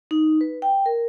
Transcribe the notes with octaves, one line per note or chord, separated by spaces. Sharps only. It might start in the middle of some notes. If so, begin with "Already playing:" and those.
D#4
B4
G5
A#4